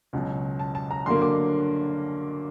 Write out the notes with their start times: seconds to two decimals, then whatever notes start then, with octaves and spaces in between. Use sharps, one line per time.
0.13 C#2 B2 F#3
0.59 A5
0.75 A5
0.91 A#5
1.06 G2 D3 F#3 A#3 C6
1.22 D6